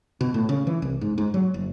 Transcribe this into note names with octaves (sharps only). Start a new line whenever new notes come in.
B2
A2
C#3
E3
C2
G#2
G#2
F#3
F#1